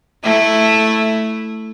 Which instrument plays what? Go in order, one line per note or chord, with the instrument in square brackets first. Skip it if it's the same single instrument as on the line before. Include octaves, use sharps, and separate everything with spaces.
[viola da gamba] A3 E4